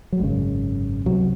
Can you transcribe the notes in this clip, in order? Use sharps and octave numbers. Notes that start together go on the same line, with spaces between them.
F#3
G#1 F#2 C#3 G#3
C#2 C3 F#3